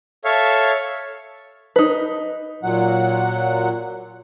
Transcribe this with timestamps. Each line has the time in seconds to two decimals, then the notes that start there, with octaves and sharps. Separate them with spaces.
0.24 A4 C#5 E5 F5
1.76 D#4 B4
2.63 A#2 F#3 F#5